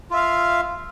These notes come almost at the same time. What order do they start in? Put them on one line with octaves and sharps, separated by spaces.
F4 E5 F5